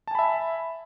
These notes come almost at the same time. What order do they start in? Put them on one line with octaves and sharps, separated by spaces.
A5 G#5 B5 E5